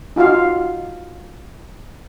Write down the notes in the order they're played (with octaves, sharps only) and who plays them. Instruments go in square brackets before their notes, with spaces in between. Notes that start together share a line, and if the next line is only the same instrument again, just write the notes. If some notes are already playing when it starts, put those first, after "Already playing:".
[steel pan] D#4 F4 F#4 F5